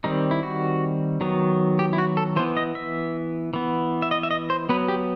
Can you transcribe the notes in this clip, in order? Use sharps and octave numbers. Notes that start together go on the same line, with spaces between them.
D#3 G3 C4 D#4
E4
F#4
D#3 F#3 B3
G4
E4
F#4
A4
E3 B3 C5
D#5
E5
E3 B3
E5
D#5
E5
D#5
C5
F#3 B3 B4
G4